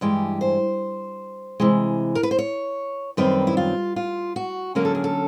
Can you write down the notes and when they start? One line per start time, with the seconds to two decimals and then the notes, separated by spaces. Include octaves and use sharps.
0.01 G2 E3 G#3 G4
0.41 C5
1.60 C3 E3 G#3
2.15 A#4
2.23 B4
2.31 C5
2.38 C#5
3.17 F#2 D#3 G3 C4 B4
3.47 E4
3.57 F4
3.96 F4
4.36 F#4
4.75 D3 F#3 A#3 C#4 A#4
4.85 A4
4.95 G#4
5.04 A4